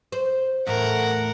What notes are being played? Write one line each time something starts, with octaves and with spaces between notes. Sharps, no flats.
C5
E2 A2 A#4 F#5